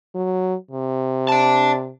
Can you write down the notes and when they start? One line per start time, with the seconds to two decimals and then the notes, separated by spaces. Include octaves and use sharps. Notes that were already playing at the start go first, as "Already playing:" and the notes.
0.15 F#3
0.71 C3
1.29 D5 A5